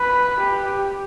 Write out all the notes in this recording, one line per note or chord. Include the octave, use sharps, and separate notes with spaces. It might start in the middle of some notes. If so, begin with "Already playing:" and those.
Already playing: B4
G4